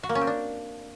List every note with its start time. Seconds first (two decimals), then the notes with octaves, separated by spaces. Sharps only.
0.03 F#4
0.09 A#3
0.15 C#4
0.21 C4
0.27 D4